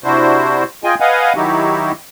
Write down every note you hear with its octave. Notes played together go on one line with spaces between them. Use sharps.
C3 D4 E4 F#4 C5
F4 G#4 D#5 G5 G#5
B4 D#5 F5 F#5 G#5
D#3 F#3 D#4 E4 F#4 G4